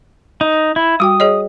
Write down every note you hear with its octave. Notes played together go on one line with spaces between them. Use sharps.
D#4
E4
G3 F#4 G5 D#6
G#4 C#5 D#5